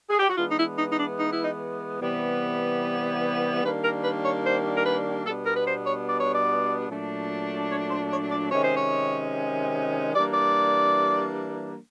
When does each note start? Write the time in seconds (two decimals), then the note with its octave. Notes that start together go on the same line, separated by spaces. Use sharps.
0.10 G#4
0.20 G4
0.29 F#4
0.38 E3 G#3 B3 D4 F4
0.50 D#4
0.58 E4
0.79 D#4
0.92 D#4
0.99 D4
1.19 D#4
1.32 E4
1.44 D#4
2.01 C3 E3 G3 B3
3.63 D#3 G3 A#3 D4 B4
3.84 A#4
4.04 B4
4.24 C#5
4.45 C5
4.76 A#4
4.85 B4
5.26 B2 G3 B3 D4 A4
5.46 A#4
5.57 B4
5.67 C5
5.87 C#5
6.08 D5
6.21 C#5
6.34 D5
6.89 A#2 F#3 A3 D4
7.70 C#5
7.91 C5
8.11 C#5
8.31 D5
8.51 C3 D#3 G#3 C#4 C#5
8.64 C5
8.76 C#5
10.14 E3 G3 A#3 D4 D5
10.33 D5